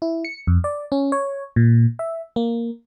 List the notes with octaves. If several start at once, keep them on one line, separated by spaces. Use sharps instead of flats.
E4
C#7
F2
D5
C#4
C#5
A#2
E5
A#3